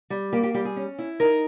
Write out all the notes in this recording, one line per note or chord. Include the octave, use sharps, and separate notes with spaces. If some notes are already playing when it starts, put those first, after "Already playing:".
G3
A#3 G4
G4
G3 G4
G#4
C#4
E4
D#4 A#4